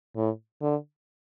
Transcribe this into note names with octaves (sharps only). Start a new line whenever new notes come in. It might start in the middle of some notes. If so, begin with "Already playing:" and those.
A2
D3